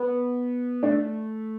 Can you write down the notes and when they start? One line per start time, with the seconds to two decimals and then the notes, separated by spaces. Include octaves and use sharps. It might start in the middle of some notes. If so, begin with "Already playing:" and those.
Already playing: B3
0.83 A3 D4